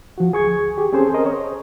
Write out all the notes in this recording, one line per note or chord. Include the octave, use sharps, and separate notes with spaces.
F3 F#4
D2 G#4 C#6 G#6
G4 G#4
C4 C#4 G#4 A4 C5
A#4 C5 D#5
C#5